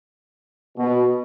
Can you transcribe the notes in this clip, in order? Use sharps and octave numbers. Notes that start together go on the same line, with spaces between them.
B2